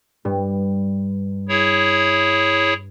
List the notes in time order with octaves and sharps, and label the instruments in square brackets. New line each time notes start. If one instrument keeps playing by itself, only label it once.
[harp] G2
[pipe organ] E4 G#4 C#5